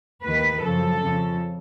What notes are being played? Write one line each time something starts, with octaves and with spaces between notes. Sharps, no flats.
D#2 D#3 B4
F#2 C#3 F3 A4
F2 C#3 F3